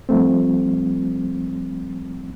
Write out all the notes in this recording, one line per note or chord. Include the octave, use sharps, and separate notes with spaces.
F3 G3 A3 C4